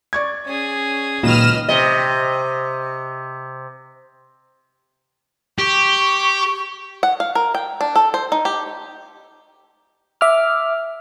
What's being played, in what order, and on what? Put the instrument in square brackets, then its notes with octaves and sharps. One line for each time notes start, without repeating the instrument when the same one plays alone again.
[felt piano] D5 C#6 G#6
[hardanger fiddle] C#4 G#4
[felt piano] C#2 D#3 F#3 [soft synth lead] A#2 [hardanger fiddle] B4 D#5 [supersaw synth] F6 E7
[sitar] C3 D#5
[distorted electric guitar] G4 [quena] C#6
[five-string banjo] F#5
F5
A#4
G5
D4
A4
C5
D#4
G4
[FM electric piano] E5 D6 F6